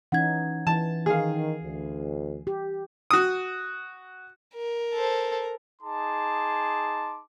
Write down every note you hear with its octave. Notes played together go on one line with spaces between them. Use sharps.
E3 C#4 D#4 F#5 G#6
E3 A5
D#3 G#4 F5
D2
G4
F#4 D#6
A#4
A4 C5
D#4 G#4 A5 C6 D6